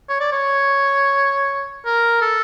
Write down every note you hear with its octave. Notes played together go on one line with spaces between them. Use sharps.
C#5
D5
C#5
A#4
A4